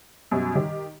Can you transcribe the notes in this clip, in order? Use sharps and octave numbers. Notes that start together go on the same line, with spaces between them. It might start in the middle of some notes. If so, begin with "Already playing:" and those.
F#2 B2 G3
D#3 G4